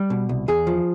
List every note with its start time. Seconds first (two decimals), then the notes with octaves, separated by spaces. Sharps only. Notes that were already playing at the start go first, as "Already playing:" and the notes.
Already playing: G3
0.10 B2
0.29 C2
0.48 E2 G#4
0.67 F3